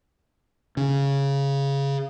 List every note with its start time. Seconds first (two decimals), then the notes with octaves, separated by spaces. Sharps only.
0.77 C#3